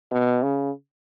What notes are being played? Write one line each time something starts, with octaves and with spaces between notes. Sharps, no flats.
B2
C#3